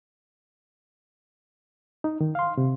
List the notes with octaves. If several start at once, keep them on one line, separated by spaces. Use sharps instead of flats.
D#4
D#3
F5 C6
C3